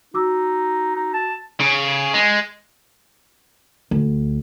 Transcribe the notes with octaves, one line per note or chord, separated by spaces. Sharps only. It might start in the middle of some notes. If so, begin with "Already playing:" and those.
D#4 F#4 D6 E6
D#4
A5
C#3
G#3
D2